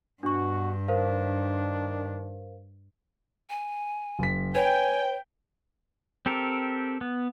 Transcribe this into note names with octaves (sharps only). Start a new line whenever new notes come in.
G2 B2 D4 F#4 C#6
D#3 D4 A#4 C5 F5
G#5
F#1 B6
B4 C#5 G5 G#5
C4 G4 A4 A#4
B3